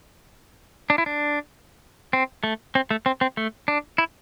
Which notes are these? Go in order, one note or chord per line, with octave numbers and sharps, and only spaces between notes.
D4
E4
D4
C4
A3
C4
A3
C4
C4
A3
D4
E4